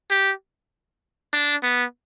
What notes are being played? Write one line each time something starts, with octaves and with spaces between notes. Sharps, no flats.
G4
D4
B3